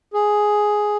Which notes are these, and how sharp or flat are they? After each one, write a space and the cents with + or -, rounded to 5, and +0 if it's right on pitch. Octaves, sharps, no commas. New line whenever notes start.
G#4 +5